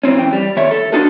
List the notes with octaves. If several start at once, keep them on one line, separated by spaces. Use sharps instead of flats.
G#2 E3 C4 C#4
E3 G5
G3
D#3 C#5 E5
A4
D4 D#4 F#4 A4 A#4